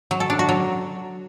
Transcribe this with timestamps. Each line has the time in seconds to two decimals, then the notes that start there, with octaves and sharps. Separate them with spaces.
0.11 F#3
0.20 A4
0.30 D4
0.39 F#4
0.49 F#3